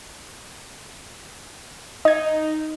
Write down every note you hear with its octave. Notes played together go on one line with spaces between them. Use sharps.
D#4 D#5 G#6